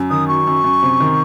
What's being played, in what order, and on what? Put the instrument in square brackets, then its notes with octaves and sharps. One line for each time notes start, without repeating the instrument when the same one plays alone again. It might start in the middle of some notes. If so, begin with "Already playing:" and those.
Already playing: [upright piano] F#2
[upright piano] D#3 [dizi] D#6
[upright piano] F#3 [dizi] C#6
[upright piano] F#2
F#2
C3
D#3